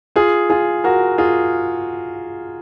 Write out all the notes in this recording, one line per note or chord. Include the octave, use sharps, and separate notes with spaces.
F4 G#4
F4 G#4
F#4 A#4
F4 G#4